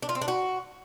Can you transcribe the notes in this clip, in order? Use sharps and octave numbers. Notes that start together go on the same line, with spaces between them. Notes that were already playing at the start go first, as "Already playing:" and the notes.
D4
F4
C4
D4
F#4